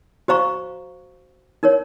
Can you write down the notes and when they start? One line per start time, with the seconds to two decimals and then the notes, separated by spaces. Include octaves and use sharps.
0.28 F#4 C5 F5 A#5 C#6
1.63 D#4 A#4 C#5